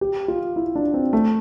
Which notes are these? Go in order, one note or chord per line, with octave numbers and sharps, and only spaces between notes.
G4
F4
E4
D4
C4
A3